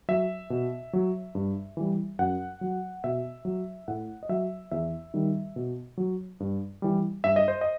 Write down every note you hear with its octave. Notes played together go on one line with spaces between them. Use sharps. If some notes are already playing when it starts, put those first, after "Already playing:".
F#3 E5
B2
F#3
G2
E3 G3
F#2 F#5
F#3
B2 E5
F#3
A2 F#5
D#5
F#3 E5
E2 E5
D#3 G3
B2
F#3
G2
E3 G3
G2 E5
D#5
C5
D#5